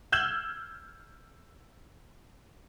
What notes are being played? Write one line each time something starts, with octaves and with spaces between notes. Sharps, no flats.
E6 F6 G6 G#6 E7 F#7